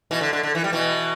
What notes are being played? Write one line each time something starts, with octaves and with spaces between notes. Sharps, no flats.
B2 E3
D3
D3
D3
E3
G3
B2 E3